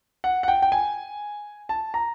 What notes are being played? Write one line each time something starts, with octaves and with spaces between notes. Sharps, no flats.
F#5
F#5
G5
G5
G#5
A5
A#5